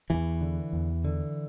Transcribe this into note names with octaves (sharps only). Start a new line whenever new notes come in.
E2 E3
D3
E2
D3